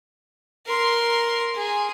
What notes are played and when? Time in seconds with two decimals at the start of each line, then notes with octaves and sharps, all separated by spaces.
0.66 A#4 C6
1.55 G#4